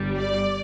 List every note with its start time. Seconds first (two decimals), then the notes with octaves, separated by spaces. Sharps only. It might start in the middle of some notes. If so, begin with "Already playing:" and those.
Already playing: G1 G2 G3
0.17 D5